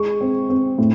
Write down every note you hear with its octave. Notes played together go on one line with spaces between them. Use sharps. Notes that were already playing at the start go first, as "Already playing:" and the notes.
Already playing: G#3 C#6
C4
C4
A2